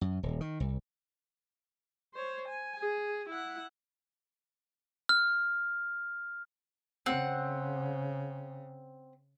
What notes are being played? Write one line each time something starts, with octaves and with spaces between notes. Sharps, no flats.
F#2
D#1
D#3
C2
C5 C#5
G#5
G#4
E4 F#5
F6
C#3 C4 F#5